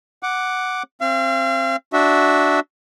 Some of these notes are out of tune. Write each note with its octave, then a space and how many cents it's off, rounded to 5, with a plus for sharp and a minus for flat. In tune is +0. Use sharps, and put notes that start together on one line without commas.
F#5 +0 D6 +0
C4 +20 F5 -35
D4 -5 F#4 +0 E5 -15